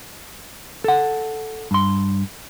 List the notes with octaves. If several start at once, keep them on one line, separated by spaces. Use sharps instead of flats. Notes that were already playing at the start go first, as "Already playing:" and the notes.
A4 F#5
G2 C6